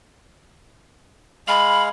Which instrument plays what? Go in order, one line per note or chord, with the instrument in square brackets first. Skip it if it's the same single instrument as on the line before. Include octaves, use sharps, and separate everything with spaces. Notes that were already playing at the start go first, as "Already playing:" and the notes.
[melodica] G#3 F5 [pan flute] B5